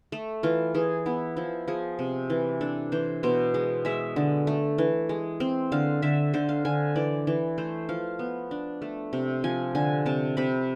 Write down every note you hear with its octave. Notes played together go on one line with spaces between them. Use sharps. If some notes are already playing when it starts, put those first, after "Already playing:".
A3
E3 F4
E3 G#4
B3 E4
F3 E4
F3 G#4
C3
E3
D4 A4
E3 C5
B2 C5
G#3
G#3 E5
D3
A3
E3
G#3
C4
D3 F5
D3 E5
D3 C5
F5
D3 G#5
E3 D5
E3
A3 C5
F3 F5
B3
D4
A3
C3
F3 G#5
D3 G#5
C3 A5
C3 B5